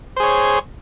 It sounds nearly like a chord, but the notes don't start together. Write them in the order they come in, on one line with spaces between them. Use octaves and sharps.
C5 G#4 C#5